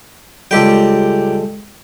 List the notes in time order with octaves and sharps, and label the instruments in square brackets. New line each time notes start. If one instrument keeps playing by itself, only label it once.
[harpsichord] C#2 G4 G5 [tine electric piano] G3 G#3 A4